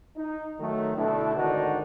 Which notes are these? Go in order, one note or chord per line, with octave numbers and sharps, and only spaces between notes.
D#4
D#3 F#3 A3
B2 D3 A3 D4 E4
G#1 D3 D#3 D4 D#4 F#4